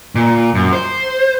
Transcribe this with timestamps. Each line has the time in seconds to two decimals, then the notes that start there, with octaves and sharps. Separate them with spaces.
0.15 A#2
0.55 F#2
0.73 C5